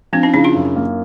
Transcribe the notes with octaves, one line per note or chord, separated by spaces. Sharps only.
F3 C4 D4
C#4 D#4
C#3 D4 E4
D#4 F4
F#2
A#3